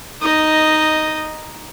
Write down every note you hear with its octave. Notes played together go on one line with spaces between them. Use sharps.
D#4 D#5